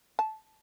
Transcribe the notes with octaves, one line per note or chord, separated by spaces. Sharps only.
A5